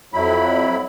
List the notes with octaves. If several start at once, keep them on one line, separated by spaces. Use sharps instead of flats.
F2 F#3 E4 B5